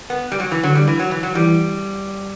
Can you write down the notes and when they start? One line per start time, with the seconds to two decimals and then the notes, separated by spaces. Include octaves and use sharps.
0.10 B3
0.32 G3
0.40 F#3
0.51 E3
0.63 D3 F#3
0.75 G3
0.87 E3
0.99 F#3
1.11 E3
1.23 F#3
1.35 E3 G3